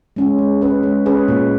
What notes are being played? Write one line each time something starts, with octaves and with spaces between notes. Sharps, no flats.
G#3 C#4
G#3
C#4 G#4 B4
G#3
C#4 G#4 B4
A#2